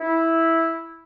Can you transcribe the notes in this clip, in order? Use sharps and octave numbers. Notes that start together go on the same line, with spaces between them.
E4